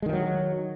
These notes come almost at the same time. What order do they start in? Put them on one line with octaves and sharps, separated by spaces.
G#3 D#3 E3 F#3